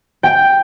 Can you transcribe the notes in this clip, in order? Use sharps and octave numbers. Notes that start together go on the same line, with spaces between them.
G5